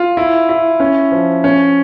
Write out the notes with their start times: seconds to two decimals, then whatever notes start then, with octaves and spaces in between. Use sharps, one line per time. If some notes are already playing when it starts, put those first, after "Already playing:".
Already playing: F4
0.17 E4
0.49 E4
0.80 C#4
1.12 F3
1.44 C#4